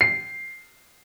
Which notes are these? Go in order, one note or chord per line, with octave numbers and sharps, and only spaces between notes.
C7